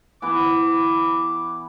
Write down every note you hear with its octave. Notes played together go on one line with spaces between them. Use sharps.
E3 B3 B4 D6